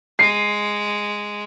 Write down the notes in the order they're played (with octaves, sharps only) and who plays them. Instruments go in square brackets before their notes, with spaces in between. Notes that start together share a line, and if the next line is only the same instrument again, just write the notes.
[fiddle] G#3 [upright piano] C7